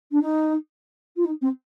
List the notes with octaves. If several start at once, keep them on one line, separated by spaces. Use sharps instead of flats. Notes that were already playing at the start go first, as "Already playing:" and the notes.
D4
D#4
F4
D#4
C4